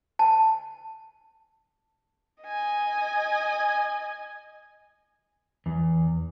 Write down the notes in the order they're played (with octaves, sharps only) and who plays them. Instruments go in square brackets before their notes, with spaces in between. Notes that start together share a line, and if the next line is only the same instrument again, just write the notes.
[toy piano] A5
[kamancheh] D#5 G#5
[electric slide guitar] E2